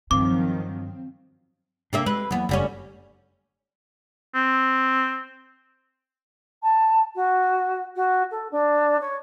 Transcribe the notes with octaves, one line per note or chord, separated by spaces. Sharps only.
G2 D#3 F3 F#3 C4 F5 D6
C3 A#3 D4 E5
G#3 B4
E2 F#3 A#3 B3
F#1 D2 G3 C#4
C4
A5
F#4
F#4
A4
D4
C#5